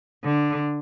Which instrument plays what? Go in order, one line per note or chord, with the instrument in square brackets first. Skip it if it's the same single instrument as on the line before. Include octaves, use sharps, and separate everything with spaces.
[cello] D3